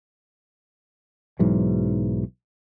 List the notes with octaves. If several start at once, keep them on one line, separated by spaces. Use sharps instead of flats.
B1 G#2 E3 F#3